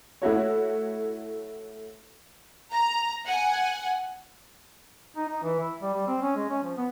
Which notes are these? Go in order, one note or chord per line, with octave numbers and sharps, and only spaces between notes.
A3 E4 F#4 C#5
A#5
F#5 G#5
D#4
D#4
E3
E4
G3
G3
C4
C#4
G#3
C#4
F3
B3